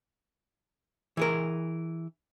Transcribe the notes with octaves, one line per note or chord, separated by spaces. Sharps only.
E3 G#4 A#4